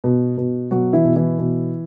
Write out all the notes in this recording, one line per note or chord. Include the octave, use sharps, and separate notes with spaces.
B2
B2
B2 F#3 F#4
E3 E4
B2
E3 E4
B2